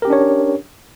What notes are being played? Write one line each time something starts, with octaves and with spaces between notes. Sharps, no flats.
C#4 D4 G4 A#4 C#5